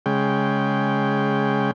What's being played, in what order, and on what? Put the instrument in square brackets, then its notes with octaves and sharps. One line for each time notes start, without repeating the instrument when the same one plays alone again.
[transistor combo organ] C#3 G#3 G5